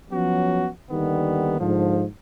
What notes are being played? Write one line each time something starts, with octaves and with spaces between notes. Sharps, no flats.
F3 F#3 B3 C#4 F#4
D#2 D3 D#3 G3 B3
G#2 D3 F3